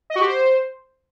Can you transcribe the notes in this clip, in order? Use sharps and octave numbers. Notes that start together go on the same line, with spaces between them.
D#5
F#4
G4
C5